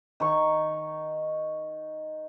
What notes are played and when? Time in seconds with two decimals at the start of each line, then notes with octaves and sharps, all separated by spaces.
0.20 D#3 C#6